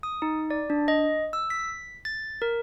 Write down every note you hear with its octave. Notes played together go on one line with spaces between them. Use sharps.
D#6
D#4
D5
D4
D#5
E6
B6
A6
A#4